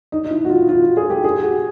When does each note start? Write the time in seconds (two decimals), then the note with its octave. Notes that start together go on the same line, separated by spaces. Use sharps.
0.12 D#4
0.25 D#4
0.31 E4
0.45 F#4
0.50 F4
0.69 F4
0.82 F#4
0.97 G#4
1.10 G4
1.24 G#4
1.43 F#4